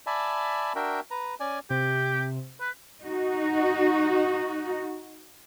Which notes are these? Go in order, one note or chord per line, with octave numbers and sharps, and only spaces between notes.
D5 E5 G#5 A5 B5
D4 F#4 A#4 E5 G5
B4 A#5
C#4 D5 G#5
C3 G4
B4
D#4 F#4